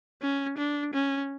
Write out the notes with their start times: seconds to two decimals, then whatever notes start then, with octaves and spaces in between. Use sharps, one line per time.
0.22 C#4
0.58 D4
0.94 C#4